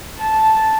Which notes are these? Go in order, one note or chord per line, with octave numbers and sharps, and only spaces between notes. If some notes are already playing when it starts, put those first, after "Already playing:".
A5